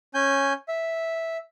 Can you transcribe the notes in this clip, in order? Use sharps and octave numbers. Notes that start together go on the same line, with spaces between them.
C#4 G#5 G6
E5